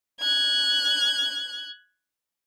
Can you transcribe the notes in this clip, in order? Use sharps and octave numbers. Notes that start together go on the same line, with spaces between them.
F#6 G#6